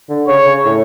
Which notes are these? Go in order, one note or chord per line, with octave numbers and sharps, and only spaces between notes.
D3
C#3 C#5
C#3
A2